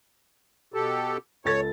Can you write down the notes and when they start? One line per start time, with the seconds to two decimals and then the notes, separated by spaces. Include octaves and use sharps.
0.74 B2 G4 A4
1.45 C#2 A4 C#5 A6